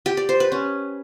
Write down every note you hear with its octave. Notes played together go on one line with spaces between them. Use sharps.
G4
D5
C5
B4
C#4